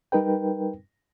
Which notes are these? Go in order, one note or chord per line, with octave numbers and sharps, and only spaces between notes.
G3 D#4 A#4 B4 G5